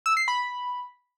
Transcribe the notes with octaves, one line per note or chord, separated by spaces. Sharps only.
E6
C7
B5